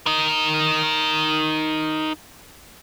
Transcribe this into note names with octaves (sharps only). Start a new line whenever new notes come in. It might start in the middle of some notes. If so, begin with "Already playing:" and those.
D#4 A#4